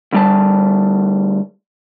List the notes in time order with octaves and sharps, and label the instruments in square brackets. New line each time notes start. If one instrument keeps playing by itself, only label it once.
[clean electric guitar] D2 G3 A5